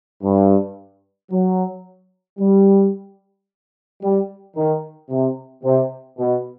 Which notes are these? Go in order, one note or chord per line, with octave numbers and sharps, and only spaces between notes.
G2
F#3
G3
G3
D#3
C3
C3
B2